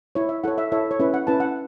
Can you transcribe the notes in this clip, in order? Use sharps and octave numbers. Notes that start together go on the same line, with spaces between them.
E4 C#5
E5
E4 A4 C#5 F#5
E5
E4 A4 C#5 E5
C#5
C#4 E4 B4 E5
F#5
C#4 E4 B4 A5
F#5